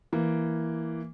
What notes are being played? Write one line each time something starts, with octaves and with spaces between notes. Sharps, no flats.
E3 A#3